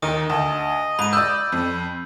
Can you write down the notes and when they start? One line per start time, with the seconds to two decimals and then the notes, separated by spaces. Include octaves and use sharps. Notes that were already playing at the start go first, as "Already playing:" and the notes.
0.02 D#2 D#3 D#6
0.29 D2 D#5 A5
0.99 G#2 B5 D#7
1.13 D5 B5 E6 G6
1.52 F2